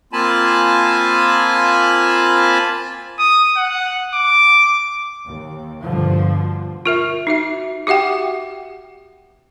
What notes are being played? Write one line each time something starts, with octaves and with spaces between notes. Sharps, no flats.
A#3 C4 F4 G#5 A5 B5
D#6
F#5
D6
D#2
G2 B2 D3 F3
F4 A#4 E5
D#4 F#4 E5
F#4 G4 E5 F#5 G5